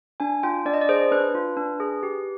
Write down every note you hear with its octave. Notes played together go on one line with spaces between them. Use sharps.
D4 G#5
F4 G5
D4 D5
D#5
D5
G#4 C5
D4 B4
F4
D4
G#4
G4